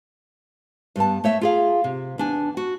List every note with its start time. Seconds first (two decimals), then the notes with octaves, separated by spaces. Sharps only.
0.96 G2 G3 B3 A5
1.24 A3 C#5 E5
1.41 F4 G#4 F5
1.84 C3
2.18 E2 D4 G#5
2.57 F#4